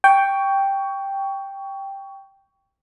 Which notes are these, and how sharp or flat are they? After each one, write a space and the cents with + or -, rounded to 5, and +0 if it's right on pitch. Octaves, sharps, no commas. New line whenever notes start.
G5 +0 C#6 +20